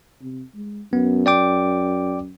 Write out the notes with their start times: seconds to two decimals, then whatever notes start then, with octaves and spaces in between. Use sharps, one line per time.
0.22 C3
0.55 G#3
0.93 F#2 B3
1.26 D5 G5 D6